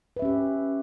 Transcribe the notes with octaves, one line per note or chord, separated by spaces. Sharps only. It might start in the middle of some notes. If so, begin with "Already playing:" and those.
C#4 G4 B4 E5